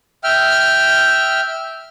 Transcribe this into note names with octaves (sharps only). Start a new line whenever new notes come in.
E5 G5 F6